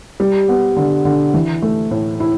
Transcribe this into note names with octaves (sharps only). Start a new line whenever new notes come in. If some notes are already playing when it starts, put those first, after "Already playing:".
G3
B3
D3
D3
E3
A3
A2
E4